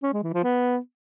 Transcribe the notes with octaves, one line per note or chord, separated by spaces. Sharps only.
C#4
G#3
E3
F3
B3